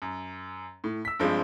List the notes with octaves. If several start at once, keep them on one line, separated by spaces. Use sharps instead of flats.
F#2
A2
E6 B6
G2 F3 G#3 C4